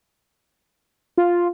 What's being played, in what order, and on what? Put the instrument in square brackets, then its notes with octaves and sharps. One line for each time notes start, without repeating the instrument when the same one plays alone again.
[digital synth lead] F4